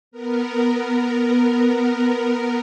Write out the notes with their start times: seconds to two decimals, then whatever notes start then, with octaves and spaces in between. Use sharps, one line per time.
0.11 B3 A#4